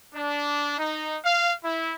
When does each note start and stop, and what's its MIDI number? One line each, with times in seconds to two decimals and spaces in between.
0.13 0.77 62
0.77 1.16 63
1.24 1.51 77
1.63 1.95 64